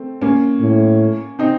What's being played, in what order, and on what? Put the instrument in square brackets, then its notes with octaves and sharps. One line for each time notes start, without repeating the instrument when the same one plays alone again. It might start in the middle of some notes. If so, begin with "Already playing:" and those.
Already playing: [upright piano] A3 C4
A#3 C#4
[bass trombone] A2
[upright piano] C4 D#4